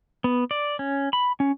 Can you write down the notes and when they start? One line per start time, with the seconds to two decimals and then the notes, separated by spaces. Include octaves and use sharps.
0.24 B3
0.51 D5
0.79 C#4
1.13 B5
1.40 C#4